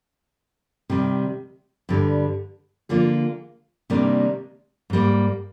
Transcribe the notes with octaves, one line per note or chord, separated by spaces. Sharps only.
C3 D#3 G3
G2 D3 G3
D3 F3 A#3 F4 G#4
C3 D#3 G3 A#3 D4
G#2 G3 A#3